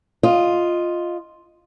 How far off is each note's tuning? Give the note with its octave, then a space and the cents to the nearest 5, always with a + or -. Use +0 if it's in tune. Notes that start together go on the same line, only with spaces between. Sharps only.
F4 +0 D#5 +0